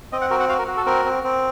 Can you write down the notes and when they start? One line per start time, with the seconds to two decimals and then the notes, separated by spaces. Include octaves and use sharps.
0.12 C4 D#5
0.21 F#5
0.31 F#4 A#4
0.40 F#5
0.49 F#4 F5
0.59 A#4
0.68 F#4
0.77 A4
0.86 C4 A#4
1.05 C4
1.24 C4